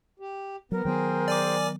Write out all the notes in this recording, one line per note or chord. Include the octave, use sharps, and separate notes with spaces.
G4
F#3 B3 A#4
D#3 F#3 B3 G#4 C5 G5
D5 G#5 D6